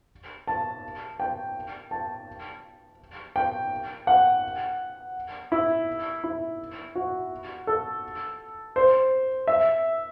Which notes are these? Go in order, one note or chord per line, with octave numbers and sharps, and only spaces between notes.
A5
G5
A5
G5
F#5
E4
E4
F#4
A4
C5
E5